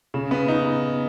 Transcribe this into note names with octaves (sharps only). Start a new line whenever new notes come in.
C#3
B3
D#4